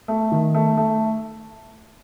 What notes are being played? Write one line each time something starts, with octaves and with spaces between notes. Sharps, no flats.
A3
D#3
A3
A3